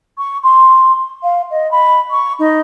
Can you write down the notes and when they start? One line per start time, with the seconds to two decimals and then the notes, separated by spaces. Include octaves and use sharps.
0.18 C#6
0.43 C6
1.23 F5
1.50 D#5
1.71 B5
2.11 C#6
2.39 D#4